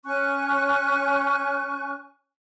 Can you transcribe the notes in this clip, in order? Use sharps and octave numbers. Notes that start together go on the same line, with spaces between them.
C#4 G#5 C#6 F#6